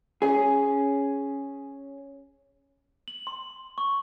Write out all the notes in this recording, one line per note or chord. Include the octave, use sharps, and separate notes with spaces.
C#4 G#4
F#7
C6
C#6